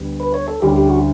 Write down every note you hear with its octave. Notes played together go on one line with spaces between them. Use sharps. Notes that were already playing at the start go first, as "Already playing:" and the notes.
Already playing: D2 D3 G3 B3
B4
C#5
A4
D2 D3 G3 C#4 E4 G4
G4
F#4